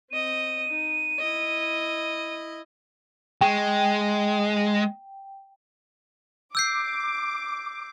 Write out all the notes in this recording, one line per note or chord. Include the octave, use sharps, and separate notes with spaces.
C4 D#5 D#7
D#4
E4 D#5
G#3 G5
D6 E6 G6 C7